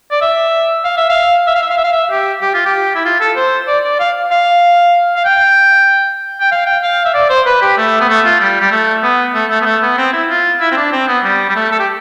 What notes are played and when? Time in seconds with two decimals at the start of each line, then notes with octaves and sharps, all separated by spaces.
0.11 D5
0.21 E5
0.85 F5
0.97 E5
1.10 F5
1.47 E5
1.55 F5
1.63 E5
1.70 F5
1.77 E5
1.84 F5
1.92 E5
2.11 G4
2.41 G4
2.54 F4
2.65 G4
2.95 E4
3.05 F4
3.20 A4
3.36 C5
3.67 D5
3.84 D5
4.00 F5
4.31 F5
5.16 F5
5.25 G5
6.40 G5
6.51 F5
6.66 G5
6.83 F5
7.05 E5
7.14 D5
7.30 C5
7.46 B4
7.62 G4
7.77 A3
8.01 B3
8.09 A3
8.25 F4
8.40 G3
8.61 G3
8.71 A3
9.03 B3
9.34 A3
9.50 A3
9.61 B3
9.66 A3
9.82 B3
9.97 C4
10.13 E4
10.29 F4
10.60 E4
10.72 C4
10.77 D4
10.92 C4
11.08 B3
11.24 G3
11.49 G3
11.55 A3
11.72 A4
11.79 G4